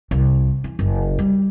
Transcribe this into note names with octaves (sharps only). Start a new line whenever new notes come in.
C2
E3
F#1
G3